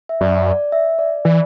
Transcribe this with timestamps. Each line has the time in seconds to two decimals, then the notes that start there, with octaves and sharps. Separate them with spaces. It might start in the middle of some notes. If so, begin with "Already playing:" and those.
0.09 E5
0.21 F#2 D5
0.47 D5
0.72 E5
0.99 D5
1.25 E3 D5